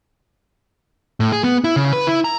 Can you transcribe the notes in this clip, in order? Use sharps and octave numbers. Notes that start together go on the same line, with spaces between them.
A2
G#4
B3
E4
C#3
B4
E4
A#5